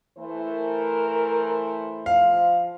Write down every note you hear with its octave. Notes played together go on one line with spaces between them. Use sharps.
E3 A3 C5
A#4
F3 F5